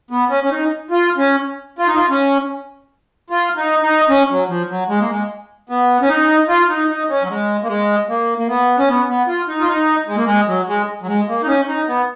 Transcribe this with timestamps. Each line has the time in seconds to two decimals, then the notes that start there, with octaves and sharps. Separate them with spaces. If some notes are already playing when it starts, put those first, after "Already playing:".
0.11 B3
0.30 C#4
0.44 C#4
0.50 D#4
0.91 F4
1.17 C#4
1.79 F4
1.87 D#4
1.96 F4
2.10 C#4
3.30 F4
3.57 D#4
3.83 D#4
4.09 C#4
4.30 F#3
4.49 F3
4.70 F#3
4.89 G#3
5.00 A#3
5.10 G#3
5.69 B3
6.02 C#4
6.09 D#4
6.48 F4
6.69 D#4
6.89 D#4
7.09 C#4
7.22 F#3
7.29 G#3
7.63 A#3
7.68 G#3
8.09 A#3
8.38 A#3
8.48 B3
8.78 C#4
8.88 B3
9.09 B3
9.28 F4
9.48 D#4
9.60 F4
9.68 D#4
10.07 G#3
10.16 A#3
10.25 G#3
10.48 F#3
10.68 G#3
11.02 F#3
11.07 G#3
11.28 A#3
11.43 D#4
11.47 C#4
11.68 D#4
11.88 B3